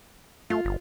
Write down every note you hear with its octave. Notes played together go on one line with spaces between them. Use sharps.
A3 F4
G1